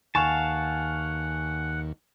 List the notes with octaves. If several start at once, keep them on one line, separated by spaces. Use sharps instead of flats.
D#2 F5 F#5 G#5 A5 C#6 E7